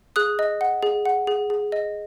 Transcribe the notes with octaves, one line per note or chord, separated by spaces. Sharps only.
G#4 D#6 F#6
D#5
F#5
G#4
F#5
G#4
G#4
D#5